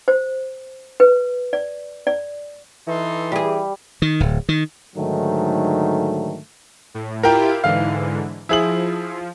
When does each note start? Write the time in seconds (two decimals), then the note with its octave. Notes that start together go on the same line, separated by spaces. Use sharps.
0.08 C5
1.00 B4
1.53 D5
2.07 D5
2.88 E3 D#4 A4 C6
3.32 G3 G4 G#4
4.02 D#3
4.20 D1
4.49 D#3
4.96 G#2 D3 D#3 F#3 A3
6.94 A2
7.23 E4 F4 G4 A#4 G5
7.64 G#2 D3 E3 F5
8.49 F3 E4 G#4 F#7